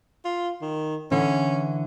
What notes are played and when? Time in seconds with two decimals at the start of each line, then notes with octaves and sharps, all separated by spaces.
0.25 F4
0.61 D#3
1.11 D3 E3 C#4